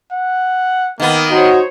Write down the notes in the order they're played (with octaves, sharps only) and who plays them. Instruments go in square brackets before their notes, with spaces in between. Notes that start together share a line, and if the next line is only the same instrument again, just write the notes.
[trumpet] F#5
[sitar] D#3 B3 [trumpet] A#3
[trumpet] D#4 [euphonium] F#4 [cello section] C5 C#5